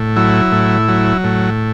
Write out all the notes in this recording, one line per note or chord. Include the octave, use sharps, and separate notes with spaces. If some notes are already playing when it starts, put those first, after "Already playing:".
Already playing: A2
F#3 E4
A2
F#3
A2